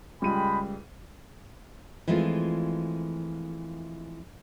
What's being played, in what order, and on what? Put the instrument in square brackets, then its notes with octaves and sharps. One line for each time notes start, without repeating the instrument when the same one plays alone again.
[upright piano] C#2 G3 D#7 [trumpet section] G#3 G5 B5
[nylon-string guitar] E3 F3 G#3 A3 C4 F4